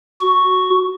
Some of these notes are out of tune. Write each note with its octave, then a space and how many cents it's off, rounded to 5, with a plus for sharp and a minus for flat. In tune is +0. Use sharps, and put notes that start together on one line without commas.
F#4 +0 C#6 +0